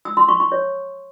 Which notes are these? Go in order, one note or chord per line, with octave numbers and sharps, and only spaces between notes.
E6
C6
C#6
C#6
C#5